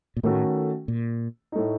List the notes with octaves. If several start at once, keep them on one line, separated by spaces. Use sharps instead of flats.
A#2
A2 D#3 A3 C#4 F#4 A4
A#2
A2 A3 D#4